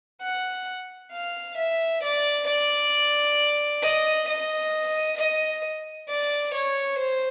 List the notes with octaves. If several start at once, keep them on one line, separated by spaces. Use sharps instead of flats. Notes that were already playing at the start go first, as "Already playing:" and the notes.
F#5
F5
E5
D5
D5
D#5
D#5
D#5
D5
C#5
C5